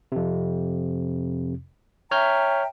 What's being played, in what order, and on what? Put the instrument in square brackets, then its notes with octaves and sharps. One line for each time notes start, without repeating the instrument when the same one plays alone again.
[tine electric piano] F2 C3
[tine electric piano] C#5 F6 G6 [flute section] E5 G5 A#5